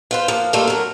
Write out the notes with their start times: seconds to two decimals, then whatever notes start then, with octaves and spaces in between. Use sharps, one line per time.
0.11 F4 B4 C5
0.28 F3 A#3
0.53 G3 A3 A#3 D4 F4
0.67 F#3 A#4